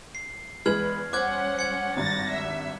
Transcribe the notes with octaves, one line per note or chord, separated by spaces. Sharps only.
C7
E2 G#3 B4 F6 G#6 F#7
G3 C#4 C5 F#5 D6 F#6 G#6
G#6 C#7
G#1 G2 A6 A#6
E5